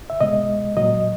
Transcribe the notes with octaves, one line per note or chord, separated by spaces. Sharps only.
E5
B2 G#3 D#5
A#2 F#3 D#5